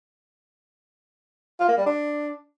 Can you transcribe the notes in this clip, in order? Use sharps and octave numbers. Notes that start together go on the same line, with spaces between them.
F4
A#3
G3
D4